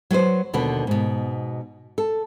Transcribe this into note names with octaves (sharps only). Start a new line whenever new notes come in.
F#3 F#4 B4 C5
D#2 B2 D3 B3
G#2 B2
A4